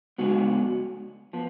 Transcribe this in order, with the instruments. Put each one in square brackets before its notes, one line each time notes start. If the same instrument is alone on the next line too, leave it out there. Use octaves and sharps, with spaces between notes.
[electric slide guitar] C#3 G#3 B3 F#4
F3 B3